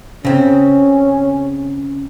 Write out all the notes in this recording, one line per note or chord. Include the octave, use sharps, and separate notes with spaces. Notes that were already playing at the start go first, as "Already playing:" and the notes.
C#3 C4 C#4